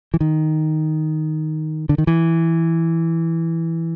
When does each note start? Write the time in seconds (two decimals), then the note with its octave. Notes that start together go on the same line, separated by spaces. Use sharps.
0.14 E3
0.20 D#3
1.89 D3
1.98 D#3
2.07 E3